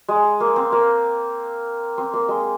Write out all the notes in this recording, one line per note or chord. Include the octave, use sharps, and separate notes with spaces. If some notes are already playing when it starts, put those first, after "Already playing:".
G#3
A#3
C4
A#3
C4
A#3
G#3